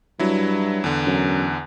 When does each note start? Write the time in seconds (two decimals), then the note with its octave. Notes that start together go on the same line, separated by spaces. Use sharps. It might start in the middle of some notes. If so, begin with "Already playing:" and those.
0.19 G2 F#3 E4
0.84 E2 D3
1.07 F#2